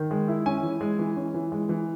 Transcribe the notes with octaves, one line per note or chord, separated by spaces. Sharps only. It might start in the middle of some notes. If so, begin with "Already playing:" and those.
Already playing: D#3
G#3
E4
C#4 G#5
E3
G#3
E3
C#4
E3
G#3
E3